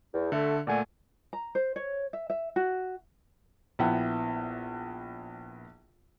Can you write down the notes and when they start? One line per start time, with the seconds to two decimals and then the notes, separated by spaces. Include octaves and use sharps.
0.14 E2
0.32 D3 A3
0.67 A#2 A3 D5 F#5 G#5
1.33 A#5
1.55 C5
1.76 C#5
2.13 E5
2.30 E5
2.56 F#4
3.79 A#1 B3 E4 F#5 G5